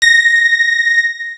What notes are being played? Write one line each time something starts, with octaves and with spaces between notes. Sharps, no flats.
A#6